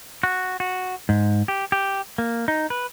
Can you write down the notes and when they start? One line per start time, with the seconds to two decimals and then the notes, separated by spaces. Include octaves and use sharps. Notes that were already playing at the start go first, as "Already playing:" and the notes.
0.23 F#4
0.60 F#4
1.09 G#2
1.48 G4
1.72 G4
2.18 A#3
2.48 D#4
2.70 B4